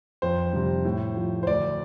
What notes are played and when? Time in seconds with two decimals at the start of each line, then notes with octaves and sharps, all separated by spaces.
0.22 F2 C5
0.53 C3 G3
0.85 A2
1.17 F3
1.43 C5
1.47 D2 D5